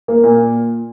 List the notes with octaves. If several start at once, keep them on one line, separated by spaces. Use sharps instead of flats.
A#3
A#2